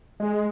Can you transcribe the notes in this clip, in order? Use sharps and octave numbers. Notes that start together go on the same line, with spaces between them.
G#3